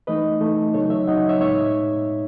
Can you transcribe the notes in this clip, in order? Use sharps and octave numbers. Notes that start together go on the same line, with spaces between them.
E3 A3 D#4 B4 D#5
E3 A3 D#4
C#3 F#3 B3 D#4 A4 C#5
C#5 E5
C#3 F#3 B3 D#4 D#5 F#5
C#5 E5
A2 G#3 B3 D#4 C#5 E5